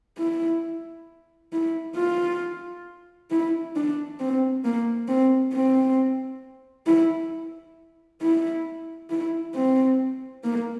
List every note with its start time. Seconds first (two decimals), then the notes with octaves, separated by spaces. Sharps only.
0.18 E4
1.53 E4
1.97 F4
3.31 E4
3.76 D4
4.20 C4
4.64 A#3
5.08 C4
5.54 C4
6.87 E4
8.21 E4
9.10 E4
9.55 C4
10.44 A#3